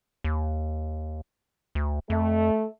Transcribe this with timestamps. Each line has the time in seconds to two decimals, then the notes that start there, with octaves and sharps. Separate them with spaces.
0.24 D#2
1.75 D2
2.10 F2 A3